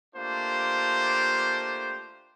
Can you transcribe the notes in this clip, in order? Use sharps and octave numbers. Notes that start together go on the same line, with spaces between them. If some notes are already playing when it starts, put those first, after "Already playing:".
A3 A#3 D4 F4 G4 C5